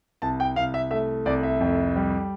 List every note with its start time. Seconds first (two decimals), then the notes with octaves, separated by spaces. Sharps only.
0.22 C2 A5
0.40 G5
0.56 C2 F5
0.74 E5
0.91 A3 E5
1.25 C2 D5
1.43 E5
1.60 F2
1.96 G3